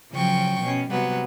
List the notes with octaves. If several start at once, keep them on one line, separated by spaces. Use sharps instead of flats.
C#3 F3 F#3 G5 C#6
B2 C#4
C3 F#3 G3 B3